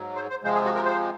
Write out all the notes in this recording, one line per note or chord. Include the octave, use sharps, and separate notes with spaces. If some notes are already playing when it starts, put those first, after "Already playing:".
Already playing: G#2 F#3
C5
C5
C3 F3 G#3 C5
G#4
F#4
A#4
C5